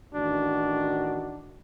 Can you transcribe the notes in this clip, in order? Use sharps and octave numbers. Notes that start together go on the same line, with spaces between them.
A1 D#3 D4 F#4